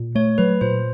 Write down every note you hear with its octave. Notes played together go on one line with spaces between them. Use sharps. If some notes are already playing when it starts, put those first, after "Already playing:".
Already playing: A#2
A3 C#5
F#3 B4
A#2 C5